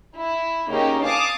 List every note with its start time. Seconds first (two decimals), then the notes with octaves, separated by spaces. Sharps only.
0.17 E4
0.69 C#3 A#3 C#4 D#4 G4
1.02 F5 G#5 A5 D6 D#6